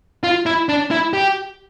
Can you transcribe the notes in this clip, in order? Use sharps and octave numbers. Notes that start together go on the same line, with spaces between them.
F4
E4
D4
E4
G4